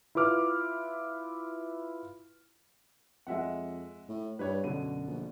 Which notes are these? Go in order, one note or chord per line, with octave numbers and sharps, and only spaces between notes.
E4 F4 B4 D6 F6
F2 G#3 E5 F#5
A2
G2 B4 C#5
F#2 B2 D3 D#7
A#1